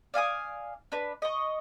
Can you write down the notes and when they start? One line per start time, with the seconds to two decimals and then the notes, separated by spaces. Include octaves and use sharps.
0.14 D5 F5 G#5 D#6
0.92 D4 B4
1.22 D#5 C#6